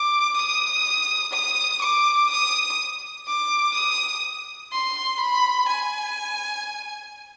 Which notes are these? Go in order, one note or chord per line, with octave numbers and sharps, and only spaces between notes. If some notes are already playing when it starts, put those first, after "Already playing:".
Already playing: D6
D#6
D#6
D6
D#6
D6
D#6
C6
B5
G#5